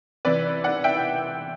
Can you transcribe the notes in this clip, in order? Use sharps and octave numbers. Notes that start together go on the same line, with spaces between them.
C3 E3 B4 D5
D5 F#5
E5 G5